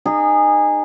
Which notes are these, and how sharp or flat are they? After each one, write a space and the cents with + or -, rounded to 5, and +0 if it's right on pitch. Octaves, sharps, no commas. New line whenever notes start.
D#4 -30 G#4 -20